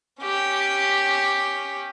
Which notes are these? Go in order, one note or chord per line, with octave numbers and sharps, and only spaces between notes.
C#4 G4